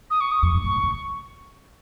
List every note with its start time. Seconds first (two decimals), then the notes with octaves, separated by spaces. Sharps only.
0.10 D#6
0.20 C#6
0.31 D#6
0.42 F2 C#6
0.54 G2
0.64 A#2
0.76 C3
0.83 C#3